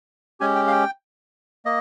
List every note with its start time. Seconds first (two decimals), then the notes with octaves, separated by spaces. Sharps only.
0.40 G#3 C#4 G4 G#5
0.56 G5
0.67 F5
0.72 G5
1.65 A#3 D#5